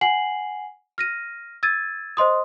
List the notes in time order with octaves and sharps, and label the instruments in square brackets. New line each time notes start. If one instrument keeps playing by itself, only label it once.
[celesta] F#5 G#5 C7 F#7
F6 A#6 D#7
E6 G#6 A6 D#7
C5 D#5 C6 D#6